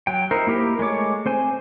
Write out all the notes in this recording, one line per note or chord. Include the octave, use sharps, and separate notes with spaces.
F#3 G5
D#4 E4 A#4 C5
A#3 E4 G4 A#4 B5
G#3 A3 C#5 D6
C4 C5 G#5